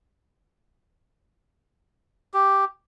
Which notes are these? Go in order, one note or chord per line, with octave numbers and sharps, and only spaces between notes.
G4